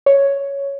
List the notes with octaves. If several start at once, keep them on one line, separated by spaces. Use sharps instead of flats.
C#5